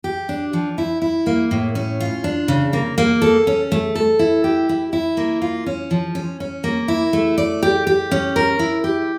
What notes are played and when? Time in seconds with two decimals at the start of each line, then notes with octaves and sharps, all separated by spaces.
0.04 G4
0.29 D4
0.53 F3
0.78 E4
1.02 E4
1.26 A#3
1.51 A2
1.75 C#4
2.00 F4
2.24 D4
2.48 C#3
2.73 A#3
2.98 A#3
3.22 A4
3.47 C#4
3.72 A3
3.95 A4
4.19 E4
4.44 G4
4.69 E4
4.93 E4
5.17 A#3
5.42 F4
5.66 C#4
5.91 F3
6.15 C#4
6.40 C#4
6.64 A#3
6.88 E4
7.13 A3
7.38 D5
7.63 G4
7.87 G4
8.12 C#4
8.36 A#4
8.59 E4
8.84 G4